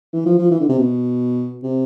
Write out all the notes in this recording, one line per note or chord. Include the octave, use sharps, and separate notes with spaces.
E3
F3
F3
E3
D3
C3
B2
C3